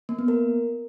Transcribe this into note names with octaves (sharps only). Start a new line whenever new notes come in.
A#3
B3
A#4